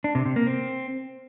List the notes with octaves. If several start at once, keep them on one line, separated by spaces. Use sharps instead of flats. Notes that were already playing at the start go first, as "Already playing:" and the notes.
D4
C3
C3
A#3
C4